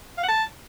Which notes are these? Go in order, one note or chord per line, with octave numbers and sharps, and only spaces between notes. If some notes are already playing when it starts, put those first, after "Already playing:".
F5
F#5
A5